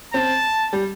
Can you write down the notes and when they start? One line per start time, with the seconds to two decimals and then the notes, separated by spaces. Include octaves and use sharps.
0.14 C4 A5
0.73 G3